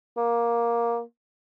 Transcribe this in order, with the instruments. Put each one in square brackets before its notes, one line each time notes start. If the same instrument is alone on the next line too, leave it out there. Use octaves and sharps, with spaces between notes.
[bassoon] A#3